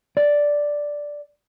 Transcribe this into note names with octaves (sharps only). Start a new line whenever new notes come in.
D5